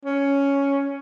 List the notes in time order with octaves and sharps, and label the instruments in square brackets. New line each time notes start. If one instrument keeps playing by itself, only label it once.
[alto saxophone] C#4